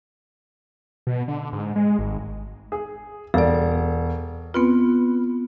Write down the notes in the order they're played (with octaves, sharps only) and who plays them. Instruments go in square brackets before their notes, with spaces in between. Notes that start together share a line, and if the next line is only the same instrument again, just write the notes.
[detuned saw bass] B2
D3
G#2
G#3
G#1
[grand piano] G#4
[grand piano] E1 [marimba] A4 D5
[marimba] B3 C4 F4 [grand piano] B4